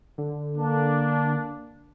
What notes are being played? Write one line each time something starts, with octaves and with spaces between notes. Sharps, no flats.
D3
A#3 D4